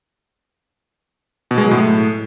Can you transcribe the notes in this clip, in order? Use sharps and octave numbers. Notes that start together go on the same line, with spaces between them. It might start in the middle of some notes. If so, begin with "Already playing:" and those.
B2
G#3
F#3
A2